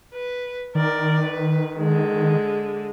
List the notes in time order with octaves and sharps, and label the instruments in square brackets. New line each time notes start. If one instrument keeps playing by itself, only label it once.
[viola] B4
[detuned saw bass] D#3 [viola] A#4 D5
[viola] B4
D3 G#3